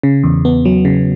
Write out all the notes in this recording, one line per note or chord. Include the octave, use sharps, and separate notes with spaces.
C#3
E2
B3
F#3
C#3